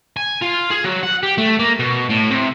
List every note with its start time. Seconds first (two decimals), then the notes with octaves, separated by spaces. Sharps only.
0.16 G#5
0.41 F4
0.70 G#4
0.84 F#3
1.03 F#5
1.23 G4
1.38 A3
1.59 A#3
1.79 B2
2.10 A2
2.31 C3